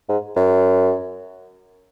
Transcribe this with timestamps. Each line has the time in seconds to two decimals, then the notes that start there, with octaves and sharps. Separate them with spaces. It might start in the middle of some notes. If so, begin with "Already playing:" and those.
0.09 G#2
0.36 F#2